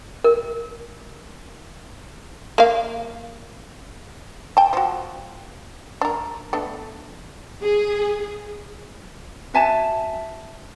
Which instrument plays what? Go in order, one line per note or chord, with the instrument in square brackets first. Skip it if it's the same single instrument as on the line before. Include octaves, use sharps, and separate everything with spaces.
[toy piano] A#4
[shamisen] A#3 F5
G5 A5
F3 F#4
D4 A#4
A3 B3 D4
[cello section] G#4
[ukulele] F#4 E5 G#5 A5